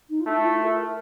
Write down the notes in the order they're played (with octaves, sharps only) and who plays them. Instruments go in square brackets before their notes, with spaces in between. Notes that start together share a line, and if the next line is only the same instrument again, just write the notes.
[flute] D#4
F4
[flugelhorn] A3 [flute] E4
[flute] F4
A#4
A#4